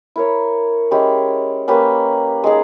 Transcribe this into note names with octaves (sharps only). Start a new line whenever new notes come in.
E4 A#4 C#5
G#3 C#4 E4 G4
A#3 C#4 G4 B4
G#3 D#4 G#4